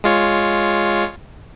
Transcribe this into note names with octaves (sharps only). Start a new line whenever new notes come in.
G#3 F4 C#5